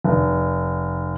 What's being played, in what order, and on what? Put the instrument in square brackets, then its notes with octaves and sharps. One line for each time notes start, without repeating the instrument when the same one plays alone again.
[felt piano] F1